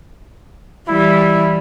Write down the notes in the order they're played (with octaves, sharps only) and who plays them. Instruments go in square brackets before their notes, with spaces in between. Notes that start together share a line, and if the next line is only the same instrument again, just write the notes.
[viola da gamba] E3 G3 [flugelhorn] E4